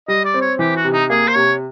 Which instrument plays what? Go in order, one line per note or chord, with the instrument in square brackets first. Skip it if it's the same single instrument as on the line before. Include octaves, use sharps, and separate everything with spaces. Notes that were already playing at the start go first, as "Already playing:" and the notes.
[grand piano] G3 [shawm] D#5
[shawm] D5
[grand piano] C4
[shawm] C#5
[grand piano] E3 [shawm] G4
[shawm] F#4
[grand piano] C3
[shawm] D#4
[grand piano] A#3 [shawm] G#4
[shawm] C5
[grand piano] C3 [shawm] C#5